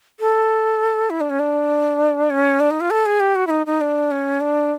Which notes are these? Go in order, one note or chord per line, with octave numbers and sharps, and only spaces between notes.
A4
E4
D4
C#4
D4
C#4
D4
D#4
F4
A4
G#4
G4
F#4
E4
D#4
D#4
D4
C#4
D4